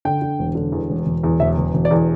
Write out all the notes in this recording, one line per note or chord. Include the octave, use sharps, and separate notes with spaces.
D3 G5
D3
E1
D3
E2
E1
E1
E2
E1 E5
E1
E1
D5
E2